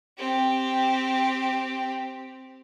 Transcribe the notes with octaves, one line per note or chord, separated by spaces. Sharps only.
C4 G4